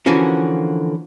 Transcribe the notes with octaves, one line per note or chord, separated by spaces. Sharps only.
D3 E3 F3 A#3 C#4 F#4